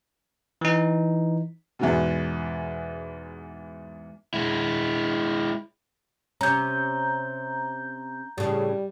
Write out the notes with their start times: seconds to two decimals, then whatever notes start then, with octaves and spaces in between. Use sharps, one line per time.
0.61 E3 D#4
1.79 E2 G#2 B2
4.34 G#3 E4
6.41 C3 C#4 A#5 G6
8.38 A2 C#3 G3